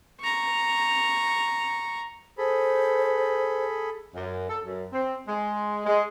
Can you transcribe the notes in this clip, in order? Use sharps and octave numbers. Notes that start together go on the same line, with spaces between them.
A#5 C#6
G#4 A4 C5 B5
F#2
A4
F#2
C4
G#3
G#3